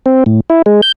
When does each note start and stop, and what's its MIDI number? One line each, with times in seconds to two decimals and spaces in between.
0.06 0.24 60
0.26 0.40 45
0.50 0.62 64
0.66 0.81 56
0.82 0.92 91